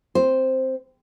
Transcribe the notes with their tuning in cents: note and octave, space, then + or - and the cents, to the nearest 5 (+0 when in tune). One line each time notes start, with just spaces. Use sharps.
C4 +0 C5 +0